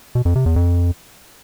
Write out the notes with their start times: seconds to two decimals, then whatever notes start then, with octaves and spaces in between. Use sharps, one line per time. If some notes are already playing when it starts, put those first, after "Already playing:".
0.15 B2
0.25 F2
0.35 C3
0.46 E2
0.56 F2